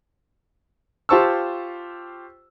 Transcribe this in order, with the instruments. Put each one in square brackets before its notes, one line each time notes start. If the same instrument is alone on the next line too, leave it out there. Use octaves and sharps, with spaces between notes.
[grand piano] F4 G4 C5 A5 C#6 E6